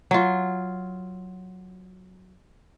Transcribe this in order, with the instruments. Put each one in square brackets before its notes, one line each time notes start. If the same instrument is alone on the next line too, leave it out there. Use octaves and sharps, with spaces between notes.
[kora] F#3 F4